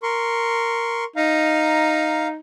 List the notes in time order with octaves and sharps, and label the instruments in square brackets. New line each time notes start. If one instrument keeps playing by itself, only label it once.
[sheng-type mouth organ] A#4 C6 C#6
[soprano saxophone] D#4 [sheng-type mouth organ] F5 A#5